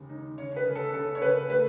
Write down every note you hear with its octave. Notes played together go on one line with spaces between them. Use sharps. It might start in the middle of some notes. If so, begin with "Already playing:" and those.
Already playing: D#2 C#3 G#3
D#4
C#3 C#5
B4
C#3
A4
C#3 A4
C#5
C#3 B4
A3 B4